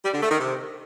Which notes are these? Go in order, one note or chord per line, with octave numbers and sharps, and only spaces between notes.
G3
D3
A3
D#3
C3